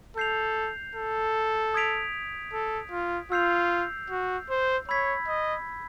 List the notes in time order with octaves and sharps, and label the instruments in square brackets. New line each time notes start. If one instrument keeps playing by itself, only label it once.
[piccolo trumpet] A4 [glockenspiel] G6 C7 F7
[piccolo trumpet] A4
[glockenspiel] D#6 G#6 B6 D7 F7
[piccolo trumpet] A4
F4
[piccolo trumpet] F4 [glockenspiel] E6 G6 C7 F7
[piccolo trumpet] F#4
C5
[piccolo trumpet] C#5 [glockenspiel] B5 E6 G#6 B6
[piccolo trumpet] D#5